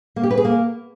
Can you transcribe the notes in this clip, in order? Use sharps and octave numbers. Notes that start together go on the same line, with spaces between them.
A#3
G4
B4
G#4
A#3